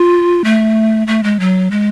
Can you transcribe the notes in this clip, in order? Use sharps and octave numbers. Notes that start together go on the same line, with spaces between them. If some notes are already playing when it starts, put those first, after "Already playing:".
Already playing: F4
A3
A3
G#3
F#3
G#3